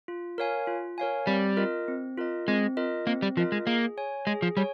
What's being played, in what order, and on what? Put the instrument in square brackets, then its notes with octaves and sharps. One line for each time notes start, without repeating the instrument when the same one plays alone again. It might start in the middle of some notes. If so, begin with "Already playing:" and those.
[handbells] F4
A#4 C#5 F5 G#5
F4
A#4 C#5 F5 G#5
[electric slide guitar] G3 [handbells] C4
[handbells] F4 A#4 D#5
C4
F4 A#4 D#5
[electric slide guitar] G#3 [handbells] C4
[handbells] F4 A#4 D#5
[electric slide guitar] A#3 [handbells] C4
[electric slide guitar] G3
[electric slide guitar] F3 [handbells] F4 A#4 D#5
[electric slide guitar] G#3
[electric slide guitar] A#3 [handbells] G#4
[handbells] C#5 G#5
[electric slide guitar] G#3 [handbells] G#4
[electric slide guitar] F3
[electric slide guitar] G3 [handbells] C#5 G#5